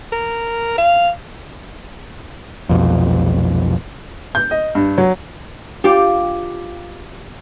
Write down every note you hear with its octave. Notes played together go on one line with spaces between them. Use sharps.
A#4
F5
F1 B1 F2
G6
D#5
G2
F#3
F4 G4